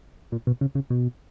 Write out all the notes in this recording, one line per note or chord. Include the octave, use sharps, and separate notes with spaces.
A#2
B2
C#3
C#3
B2